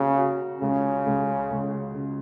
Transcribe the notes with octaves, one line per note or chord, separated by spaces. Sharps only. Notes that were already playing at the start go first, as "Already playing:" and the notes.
Already playing: C#3 A#3 F#4
F#4
C#2 C#3
C#2
C#2
C#3